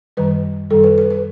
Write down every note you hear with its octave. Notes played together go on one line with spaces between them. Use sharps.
F#2 D#3 G3 B4
F#2 D#3 G3 A4
B4
B4
B4